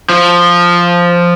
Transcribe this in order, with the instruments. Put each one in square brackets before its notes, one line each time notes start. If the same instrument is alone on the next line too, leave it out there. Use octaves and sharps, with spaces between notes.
[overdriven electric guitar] F3